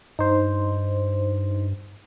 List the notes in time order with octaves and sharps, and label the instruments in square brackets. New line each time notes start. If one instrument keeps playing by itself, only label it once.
[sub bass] G2 [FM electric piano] D#4 C5